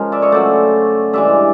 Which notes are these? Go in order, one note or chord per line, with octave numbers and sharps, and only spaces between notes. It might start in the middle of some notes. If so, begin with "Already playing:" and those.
Already playing: C#3 F3 G#3 A#4
D5 E5
C#5 D#5
C#3 F#3 A3 C5 D5
G2 E3 G#3 D5 E5